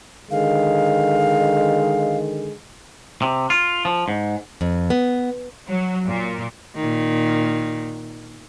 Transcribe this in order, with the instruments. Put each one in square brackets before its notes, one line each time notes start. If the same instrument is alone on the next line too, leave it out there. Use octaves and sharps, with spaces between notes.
[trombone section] D3 D#3 G#3 [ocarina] F5
[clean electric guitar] C3
F4
F3
G#2
[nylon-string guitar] F2
B3
[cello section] F#3
A#2
[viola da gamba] A#2 D#3